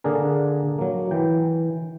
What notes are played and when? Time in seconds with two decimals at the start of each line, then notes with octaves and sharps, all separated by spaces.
0.04 D3 A#3 D4 G#4 A#4
0.78 F#3 A#3
1.11 E3 G5